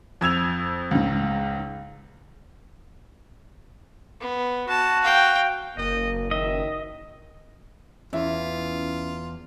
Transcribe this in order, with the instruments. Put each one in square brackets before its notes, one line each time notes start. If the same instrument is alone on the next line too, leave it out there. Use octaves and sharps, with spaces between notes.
[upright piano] F2 E6 G#6 F7
C#2 G#2
[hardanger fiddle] B3
[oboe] F#4 [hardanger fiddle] A5
[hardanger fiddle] F5 G5
[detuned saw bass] F#1 [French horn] A#3 [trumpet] D#5
[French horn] D#3 [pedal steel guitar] D#5 [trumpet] E5
[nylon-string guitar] E2 [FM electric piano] C#4 E4 [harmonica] F4 [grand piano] E5